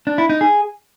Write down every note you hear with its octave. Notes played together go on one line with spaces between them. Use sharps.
D4
E4
D#4
G#4